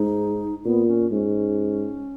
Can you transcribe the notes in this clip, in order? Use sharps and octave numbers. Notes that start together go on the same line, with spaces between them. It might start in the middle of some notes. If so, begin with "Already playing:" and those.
Already playing: G#2 D#4
A#2 B3
C#4
G#2 C#4